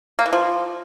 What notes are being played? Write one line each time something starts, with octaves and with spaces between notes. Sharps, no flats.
A#3
E3
F3